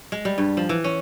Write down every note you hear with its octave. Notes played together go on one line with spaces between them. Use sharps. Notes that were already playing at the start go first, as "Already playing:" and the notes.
G#3
G3
G2
F3
E3
C#4